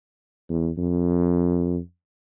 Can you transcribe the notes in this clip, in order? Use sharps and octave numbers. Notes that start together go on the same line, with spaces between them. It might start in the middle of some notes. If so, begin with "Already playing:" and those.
E2
F2